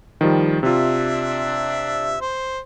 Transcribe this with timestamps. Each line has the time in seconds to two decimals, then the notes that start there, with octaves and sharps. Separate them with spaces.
0.21 D#3 F3 G3
0.63 C3 D4 F4 E5
2.21 C5